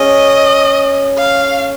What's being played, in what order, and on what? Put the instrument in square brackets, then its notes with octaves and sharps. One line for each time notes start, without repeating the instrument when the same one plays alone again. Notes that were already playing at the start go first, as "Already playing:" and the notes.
Already playing: [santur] C#4 G#4 C#5 [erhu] D#5
[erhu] F5